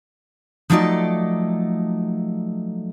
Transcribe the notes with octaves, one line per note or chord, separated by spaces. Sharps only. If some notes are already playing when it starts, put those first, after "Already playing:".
F3 F#3 A3 D#4 A4 D5